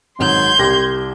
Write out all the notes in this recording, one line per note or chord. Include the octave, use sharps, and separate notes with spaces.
G#1 G#2 F#3 C6 G6 G#6
C2 G4 A#6